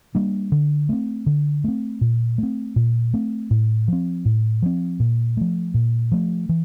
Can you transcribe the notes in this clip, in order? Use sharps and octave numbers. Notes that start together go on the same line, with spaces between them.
G3 A#3 D4
D3
A3 C4
D3
A3 C4
A#2
A3 C4
A#2
A3 C4
A2
F3 C4
A2
F3 C4
A#2
F3 A3
A#2
F3 A3
E3